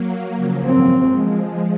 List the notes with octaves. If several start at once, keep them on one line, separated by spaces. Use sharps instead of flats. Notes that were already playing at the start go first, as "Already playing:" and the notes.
Already playing: F#3 A#3
C#3 F3
D#3 F#3 C4
F3 G#3